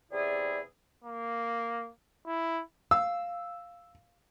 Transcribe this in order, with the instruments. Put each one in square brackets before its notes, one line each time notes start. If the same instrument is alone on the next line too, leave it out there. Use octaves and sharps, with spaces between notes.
[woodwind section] E2 C3 E4 G#4 D5
[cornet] A#3
E4
[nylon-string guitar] F5 [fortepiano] E6